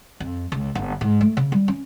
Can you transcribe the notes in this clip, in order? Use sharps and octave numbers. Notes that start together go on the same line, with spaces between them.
F2
C#2
G1
G#2
A3
C#3
G3
C#4